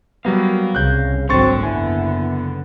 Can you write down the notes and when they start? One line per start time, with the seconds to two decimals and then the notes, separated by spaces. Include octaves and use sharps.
0.25 F#3 G3 B3 F5 A#5
0.75 C2 C#3 F#6 G6
1.29 G#1 D3 F#3 C4 C6 C#6 A6
1.63 F#1 B3 E4 G#5